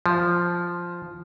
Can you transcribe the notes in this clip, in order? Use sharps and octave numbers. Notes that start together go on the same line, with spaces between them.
F3